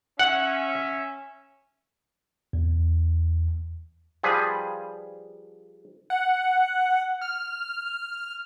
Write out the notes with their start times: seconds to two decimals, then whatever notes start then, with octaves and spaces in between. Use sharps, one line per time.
0.19 C#4 E5 F#5
2.53 E2
4.23 F3 G3 G#4 B4
6.10 F#5
7.22 F6